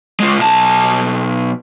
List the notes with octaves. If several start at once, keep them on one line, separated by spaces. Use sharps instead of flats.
G#3 F4
B1 A5